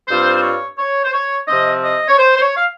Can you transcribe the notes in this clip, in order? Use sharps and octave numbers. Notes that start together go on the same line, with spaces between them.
G2 G3 C4 F4 C5
C5
C#5
C#5
C5
C#5
C3 F3 C4 D#5
D#5
C#5
C5
C5
C#5
F5